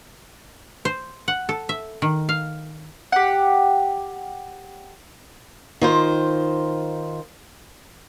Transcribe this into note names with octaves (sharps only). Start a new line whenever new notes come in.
C5
F#5
A4
E5
D#3
F5
G4 F#5
D#3 F4 C5